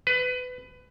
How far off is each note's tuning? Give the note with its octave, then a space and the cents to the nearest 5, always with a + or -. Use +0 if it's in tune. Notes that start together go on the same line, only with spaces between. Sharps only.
B4 +20